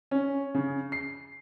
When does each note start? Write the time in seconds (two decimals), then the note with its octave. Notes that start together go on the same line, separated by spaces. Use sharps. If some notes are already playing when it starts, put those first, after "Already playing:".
0.11 C#4
0.54 C#3
0.92 C7